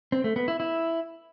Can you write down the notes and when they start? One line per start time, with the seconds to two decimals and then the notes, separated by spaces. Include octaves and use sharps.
0.12 C4
0.24 A3
0.36 B3
0.48 E4
0.60 E4